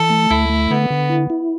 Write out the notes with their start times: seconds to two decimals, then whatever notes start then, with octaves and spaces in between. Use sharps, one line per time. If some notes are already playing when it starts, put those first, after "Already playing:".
Already playing: E3 A4
0.10 A3
0.30 D2 E4
0.49 A3
0.71 D3 B3
0.90 D3
1.10 E4
1.30 E4